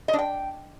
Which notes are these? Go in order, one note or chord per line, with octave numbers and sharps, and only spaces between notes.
D#5
D4
G5